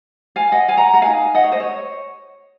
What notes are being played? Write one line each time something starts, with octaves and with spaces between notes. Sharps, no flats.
F5 G#5
D#5 F#5
F5 G#5
F#5 A#5
F#5 A#5
D#4 F#4 A#4 F5 G#5
D#5 F#5
C#5
C5 D#5
C#5